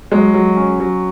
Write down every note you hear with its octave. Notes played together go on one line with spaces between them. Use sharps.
F#3 G#3
F#3
C#4
F#3